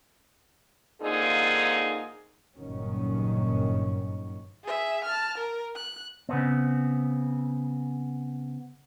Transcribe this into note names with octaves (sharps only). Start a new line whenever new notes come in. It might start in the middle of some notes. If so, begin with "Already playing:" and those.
D3 A#3 C4 D#4 F4 G#4
F#1 G2 A#2 D#3 F#3 C#4
G#4 E5
A5 F6
A#4
F#6
C#3 B3 C4